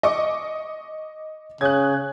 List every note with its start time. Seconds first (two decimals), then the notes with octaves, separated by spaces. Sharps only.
0.03 D#5 C#6 D6
1.61 C#3 F#6 G#6